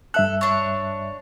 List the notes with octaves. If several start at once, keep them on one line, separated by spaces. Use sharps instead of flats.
G2 A4 E5 F#6
D4 C#5